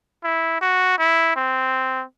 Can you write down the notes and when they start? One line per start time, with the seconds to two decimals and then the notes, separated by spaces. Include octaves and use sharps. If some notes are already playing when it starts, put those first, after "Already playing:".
0.24 E4
0.61 F#4
0.98 E4
1.36 C4